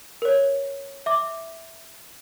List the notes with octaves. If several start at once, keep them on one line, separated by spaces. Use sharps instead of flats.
A#4 C#5
E5 D6